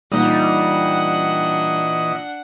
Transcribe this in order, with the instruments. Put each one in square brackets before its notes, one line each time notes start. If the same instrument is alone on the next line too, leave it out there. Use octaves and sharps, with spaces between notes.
[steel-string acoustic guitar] A#2 D#4 [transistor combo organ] E3 D#5 [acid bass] G3 [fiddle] D4 F#5